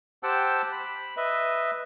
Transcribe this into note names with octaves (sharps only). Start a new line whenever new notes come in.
G4 C5 F#5 G5 A5 E6
B5
B4 D#5 E5